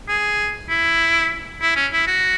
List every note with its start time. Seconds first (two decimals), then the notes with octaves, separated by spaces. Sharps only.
0.08 G#4
0.69 E4
1.61 E4
1.76 C#4
1.92 E4
2.07 F#4